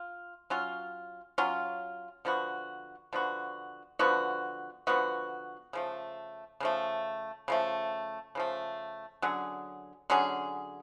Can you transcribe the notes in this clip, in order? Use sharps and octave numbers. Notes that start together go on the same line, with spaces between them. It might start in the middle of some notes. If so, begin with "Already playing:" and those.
Already playing: F4
F#3 C#4 F4
F#3 C#4 F4
D3 F3 B3 F#4
D3 F3 B3 F#4
D3 F3 B3 F#4
D3 F3 B3 F#4
C#3 F3 A3
C#3 F3 A3
C#3 F3 A3
C#3 F3 A3
D3 F#3 C#4 G#4
D3 F#3 C#4 G#4